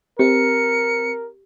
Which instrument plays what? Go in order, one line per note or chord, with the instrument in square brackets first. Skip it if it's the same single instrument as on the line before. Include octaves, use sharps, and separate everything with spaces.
[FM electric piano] C4 [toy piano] G4 [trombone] A#4 [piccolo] C#7